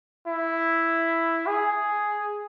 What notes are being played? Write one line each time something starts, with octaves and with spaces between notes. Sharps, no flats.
E4
G#4